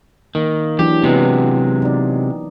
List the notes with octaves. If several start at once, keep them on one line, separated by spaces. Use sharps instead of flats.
D#3 A#3
E3 F#3 D4 G4
C3 F#3 G#3 B3
D#4 D5